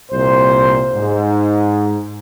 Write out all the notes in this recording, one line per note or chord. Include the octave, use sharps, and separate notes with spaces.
C2 A#2 C5
G#2